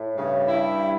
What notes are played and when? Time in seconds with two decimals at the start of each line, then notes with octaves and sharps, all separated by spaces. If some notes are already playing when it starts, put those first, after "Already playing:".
Already playing: A2
0.16 G2 C#3
0.47 E4